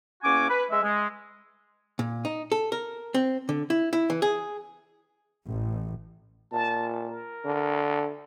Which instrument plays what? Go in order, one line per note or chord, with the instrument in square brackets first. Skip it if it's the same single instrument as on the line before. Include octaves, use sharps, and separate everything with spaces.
[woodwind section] E2 A#3 C#4 F#4 G#5 D6
B4
G#3 E5
G#3
[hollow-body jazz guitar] A#2
D#4
A4
A#4
C4
D3
E4
E4
E3
G#4
[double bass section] A1
[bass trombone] A#2 [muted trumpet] A5
[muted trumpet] A#4
[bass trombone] D3